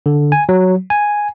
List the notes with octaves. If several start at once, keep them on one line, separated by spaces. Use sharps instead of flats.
D3
G#5
F#3
G#5